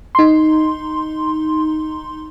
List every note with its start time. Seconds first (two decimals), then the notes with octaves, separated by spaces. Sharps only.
0.15 D#4 C6